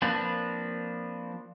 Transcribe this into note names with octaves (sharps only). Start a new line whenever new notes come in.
F3 A#3 C4 D4 B4